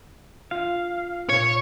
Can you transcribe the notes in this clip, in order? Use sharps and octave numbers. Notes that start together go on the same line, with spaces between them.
F4 F5
A#2 C#5